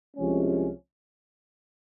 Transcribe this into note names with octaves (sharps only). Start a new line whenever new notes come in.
C2 C3 F3 G#3 C#4